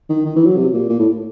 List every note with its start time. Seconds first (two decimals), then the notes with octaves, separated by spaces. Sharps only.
0.09 D#3
0.25 D#3
0.35 E3
0.46 F#3
0.57 C3
0.73 A#2
0.89 A#2
0.99 A2